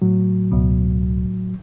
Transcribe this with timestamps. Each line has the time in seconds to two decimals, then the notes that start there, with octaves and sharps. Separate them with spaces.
0.02 A2 F#3
0.51 C#2 B2